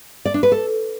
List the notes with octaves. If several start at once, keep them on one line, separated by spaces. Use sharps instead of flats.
D5
D4
B4
A4